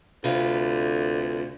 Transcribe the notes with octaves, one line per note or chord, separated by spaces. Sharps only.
D2 C3 F4 B4